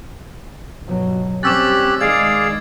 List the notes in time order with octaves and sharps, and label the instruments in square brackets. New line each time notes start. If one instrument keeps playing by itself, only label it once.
[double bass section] G1 B2 F#3
[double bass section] G3 C4 [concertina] C#4 G4 F#6 [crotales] D6 E6 A6
[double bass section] D#3 G#3 [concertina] G#4 D5 F5 [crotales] G#6